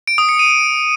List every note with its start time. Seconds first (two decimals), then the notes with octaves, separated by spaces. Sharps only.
0.07 D7
0.18 D#6
0.29 C#7
0.39 D#7